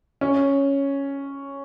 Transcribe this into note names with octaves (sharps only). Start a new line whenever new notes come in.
C#4